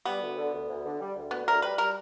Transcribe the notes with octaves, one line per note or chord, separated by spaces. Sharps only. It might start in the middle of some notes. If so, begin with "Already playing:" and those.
G3 B3
D2
D3
D2
D2
D3
G3
D2
D2 B3
D2 A#4
G3 B4
G3 A#4